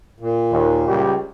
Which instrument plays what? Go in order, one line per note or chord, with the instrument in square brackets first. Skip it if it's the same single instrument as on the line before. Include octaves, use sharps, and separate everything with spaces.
[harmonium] A#2
[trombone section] D#2
C#2 G3 G4